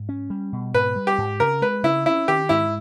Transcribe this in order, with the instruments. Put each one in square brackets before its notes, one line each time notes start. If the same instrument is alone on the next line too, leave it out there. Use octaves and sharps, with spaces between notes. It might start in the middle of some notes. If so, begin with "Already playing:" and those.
Already playing: [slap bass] G#2
C#4
G3
B2
[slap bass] G#2 [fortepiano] B4
[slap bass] G3
[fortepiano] G4
[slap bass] G#2
[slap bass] C#3 [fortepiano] A#4
[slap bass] G#3 [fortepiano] B4
[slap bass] C#3 [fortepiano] E4
[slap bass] C#4 [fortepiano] E4
[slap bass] D#3 [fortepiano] G4
[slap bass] G#2 [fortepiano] E4